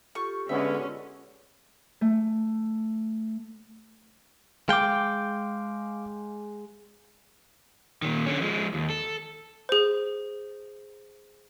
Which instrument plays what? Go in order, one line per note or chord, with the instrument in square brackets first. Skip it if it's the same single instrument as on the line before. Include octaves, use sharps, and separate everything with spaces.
[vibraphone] F4 G4 A4 [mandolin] C#6
[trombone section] D3 G#3 B3 [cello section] C#4 [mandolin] E5
[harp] A3
[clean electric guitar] G#3 G5 [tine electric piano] F5 D6
[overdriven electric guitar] A#2 D#3
D3 C#4
F3 G#3
D#2
A4
[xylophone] G#4 C5